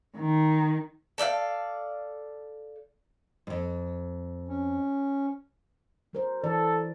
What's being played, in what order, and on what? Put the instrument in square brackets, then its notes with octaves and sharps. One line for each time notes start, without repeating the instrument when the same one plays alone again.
[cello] D#3
[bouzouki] A4 D5 E5 F5
[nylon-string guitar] F2 G#2
[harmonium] C#4
[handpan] F#3 A#4 C5
[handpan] E3 D5 [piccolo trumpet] A4